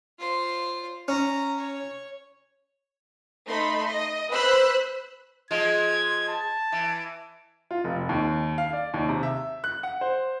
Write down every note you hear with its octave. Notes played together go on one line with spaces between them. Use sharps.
F4 C5
C#4 A#5
C#5
A3 D#4 B5 C6
D#5
B4 C5 B5 E6 F#6
F3 G#3 F4 G#6
A5
E3
F4
F1
D#2
F5
D5
D#2
C3
E5
F#6
F#5
C5